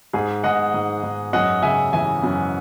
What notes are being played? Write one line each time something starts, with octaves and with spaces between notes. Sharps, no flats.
G#2 G#4
G#2 D#5 F#5
G#2
G#2
F#2 D#5 F#5
C#3 E5 G#5
E3 E5 G#5
F#2